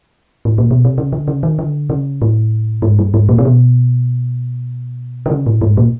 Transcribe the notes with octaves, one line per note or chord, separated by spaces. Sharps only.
A2
A#2
B2
C3
C#3
D3
C#3
D#3
D3
C#3
A2
G#2
G2
G#2
A#2
C3
B2
D3
C#3
A2
G#2
A#2